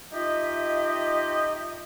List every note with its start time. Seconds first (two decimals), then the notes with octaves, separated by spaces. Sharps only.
0.13 D#4 F4 G4 D#5 E5